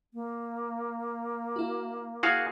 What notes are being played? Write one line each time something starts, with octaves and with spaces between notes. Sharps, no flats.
A#3
E4 F#4
E4 F#4 G#4 F5